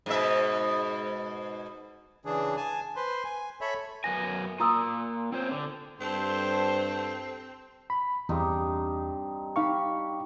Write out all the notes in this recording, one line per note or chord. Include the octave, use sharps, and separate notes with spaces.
G#2 B2 E5
C#3 E3 D4 G#4
G#5 A5
B4 C5 C6
G#5
A4 C#5 E5 B5
F#2 B3 G#5 A#6
A#3 F4 A#5 D#6 E6
C4 C#4 C5
D3
G2 C4 A4 C5
B5
E2 G2 C4 D#4
D#4 G4 F5 B5 C#6